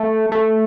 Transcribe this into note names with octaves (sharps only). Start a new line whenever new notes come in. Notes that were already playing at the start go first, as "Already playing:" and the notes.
Already playing: A3
A3